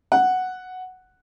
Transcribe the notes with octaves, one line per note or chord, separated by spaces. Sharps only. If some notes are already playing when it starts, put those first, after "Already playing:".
F#5